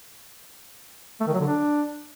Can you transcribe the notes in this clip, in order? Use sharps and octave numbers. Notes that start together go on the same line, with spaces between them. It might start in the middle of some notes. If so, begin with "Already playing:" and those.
A3
D#3
F#3
D3
D4